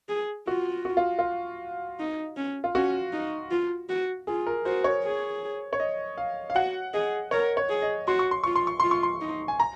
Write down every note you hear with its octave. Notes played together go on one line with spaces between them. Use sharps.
G#4
F4 F#4
F#4
F4
F4
D#4
C#4
F4
C#4 F#4
D#4
F4
F#4
F4 G#4
A#4
F#4 C5
C#5
G#4
C#5
D#5
F5
F5
F#4 F#5
G#4 D#5
A#4 C#5
C#5
G#4
D#5
F#4 C6
C#6
C6
F4 C#6
C6
C#6
F4 C6
C#6
C6
D#4
G#5
A#5